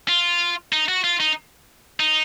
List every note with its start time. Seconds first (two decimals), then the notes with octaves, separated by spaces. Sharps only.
0.09 F4
0.73 D#4
0.88 F#4
1.04 F4
1.20 D#4
2.00 D#4